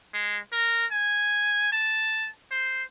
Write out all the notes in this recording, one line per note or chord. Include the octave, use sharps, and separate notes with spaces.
G#3
A#4
G#5
A5
C5